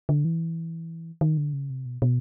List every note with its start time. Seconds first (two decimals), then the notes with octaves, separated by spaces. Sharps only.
0.09 D3
0.25 E3
1.21 D#3
1.37 D3
1.53 C#3
1.70 C3
1.86 B2
2.02 B2